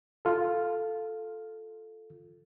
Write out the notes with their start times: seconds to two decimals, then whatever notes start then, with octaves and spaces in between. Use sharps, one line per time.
0.25 F4 A4